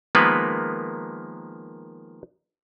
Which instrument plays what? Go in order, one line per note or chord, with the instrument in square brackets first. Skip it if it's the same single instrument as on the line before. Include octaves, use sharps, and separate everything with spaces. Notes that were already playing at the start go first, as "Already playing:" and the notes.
[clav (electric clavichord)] D#3 F3 G#3 A#3 B3 B4